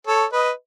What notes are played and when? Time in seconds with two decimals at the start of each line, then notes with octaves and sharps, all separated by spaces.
0.07 A4 C#5
0.32 B4 D#5